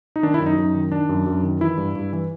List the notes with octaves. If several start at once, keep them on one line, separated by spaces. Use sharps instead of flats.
D#4
D#3 D4
E4
F#2
D#4
F#2
D#3
D#3 D4
F#2
F#2
D#3
E3 E4
G2
G2
E3